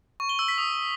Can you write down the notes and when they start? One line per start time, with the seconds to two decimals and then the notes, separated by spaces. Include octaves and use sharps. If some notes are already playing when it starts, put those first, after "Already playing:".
0.20 C#6
0.29 G7
0.39 E6
0.48 B6
0.58 D#6